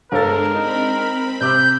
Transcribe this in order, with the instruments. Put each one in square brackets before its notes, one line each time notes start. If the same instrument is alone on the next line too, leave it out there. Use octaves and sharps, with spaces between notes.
[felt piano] G1 A4 A6 [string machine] G#3 D4 [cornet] A#4
[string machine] C4 B5 [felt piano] D#4
[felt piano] C3 D6 E6 [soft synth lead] G6